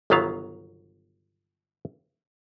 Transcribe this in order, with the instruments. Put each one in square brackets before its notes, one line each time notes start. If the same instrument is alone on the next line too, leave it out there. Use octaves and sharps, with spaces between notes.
[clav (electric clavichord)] G1 C2 D#3 F#3 B3 F5